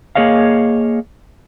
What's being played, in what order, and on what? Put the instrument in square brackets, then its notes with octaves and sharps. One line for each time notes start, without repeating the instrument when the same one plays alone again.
[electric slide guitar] A#3 G#4 C#5 D#5 F5